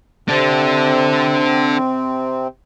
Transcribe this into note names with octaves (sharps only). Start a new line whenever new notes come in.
C3 C4 D4 A4